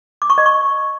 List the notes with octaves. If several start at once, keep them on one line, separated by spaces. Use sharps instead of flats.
D6
C#6
D#5
C#6